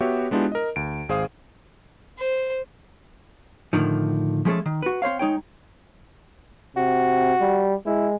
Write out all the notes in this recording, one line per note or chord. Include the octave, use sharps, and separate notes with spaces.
B3 F#4 G4 C#5 E5
G#3 B3 D4 E4 F4 G4
A#4 D#5
D2 D7
G#1 G#4 C5 F5 D#6
C5
A2 D3 D#3 F3
F3 G#3 A3 C#4 G#4 A4
D#3
F#4 B4
C4 C5 C#5 F5
G#3 D#4 C#5 G5
C3 F#4
G3
G#3 E4